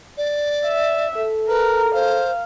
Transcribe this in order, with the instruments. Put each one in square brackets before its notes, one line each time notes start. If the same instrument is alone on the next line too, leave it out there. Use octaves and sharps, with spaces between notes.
[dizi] D5
[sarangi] E5
[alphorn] A4
[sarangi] A#4 [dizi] B4
[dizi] C5 [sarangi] F5